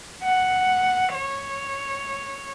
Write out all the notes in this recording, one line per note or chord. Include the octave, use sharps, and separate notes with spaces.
F#5
C#5